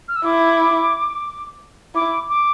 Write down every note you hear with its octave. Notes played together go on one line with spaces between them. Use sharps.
F6
E6
E4 D6
E4 D6
D6